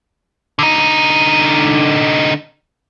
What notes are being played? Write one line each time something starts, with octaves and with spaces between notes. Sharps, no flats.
D3 D#4